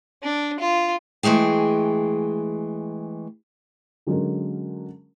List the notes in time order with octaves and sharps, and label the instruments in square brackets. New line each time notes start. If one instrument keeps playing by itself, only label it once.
[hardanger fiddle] D4
F4
[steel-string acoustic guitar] E3 G#3 A3 G#4 G5
[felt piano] D3 F#3 G#3 C#4 A#4